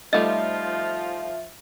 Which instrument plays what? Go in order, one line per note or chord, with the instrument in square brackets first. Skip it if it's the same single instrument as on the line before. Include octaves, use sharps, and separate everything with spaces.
[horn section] F3 F4 [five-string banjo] G3 A3 D#4 [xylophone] D#5 [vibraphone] E5